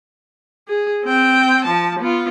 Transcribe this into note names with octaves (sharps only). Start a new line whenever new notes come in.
G#4
C4 G5
F3 A5
B3 F4